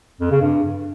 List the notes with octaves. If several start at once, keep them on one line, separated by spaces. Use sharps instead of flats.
F2
C#3
G2